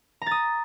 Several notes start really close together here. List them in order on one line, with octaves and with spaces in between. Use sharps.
A#5 A6 D#6